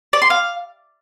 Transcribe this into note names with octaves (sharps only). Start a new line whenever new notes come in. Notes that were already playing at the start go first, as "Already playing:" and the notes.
D5
C6
F5